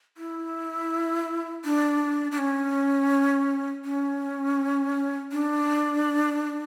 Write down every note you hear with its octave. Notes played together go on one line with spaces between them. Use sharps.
E4
D4
D4
C#4
C#4
D4